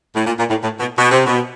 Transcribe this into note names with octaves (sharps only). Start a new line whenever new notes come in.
A2
A#2
A#2
A2
A2
B2
B2
C3
B2